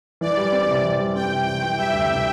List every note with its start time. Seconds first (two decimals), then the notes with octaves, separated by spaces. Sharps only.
0.21 E3 D5
0.37 G3
0.52 C4
0.69 C3
0.84 E3
1.00 G3
1.15 C4 G5
1.31 C3
1.47 C3 G5
1.62 E3
1.78 G3 E5
1.93 D2
2.10 C3